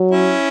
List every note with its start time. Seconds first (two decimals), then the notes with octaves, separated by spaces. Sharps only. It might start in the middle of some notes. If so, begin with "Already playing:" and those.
Already playing: F#3
0.11 C#4 E4